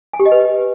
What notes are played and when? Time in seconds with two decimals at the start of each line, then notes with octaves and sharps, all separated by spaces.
0.13 G#5
0.19 G4
0.26 D#5
0.32 B4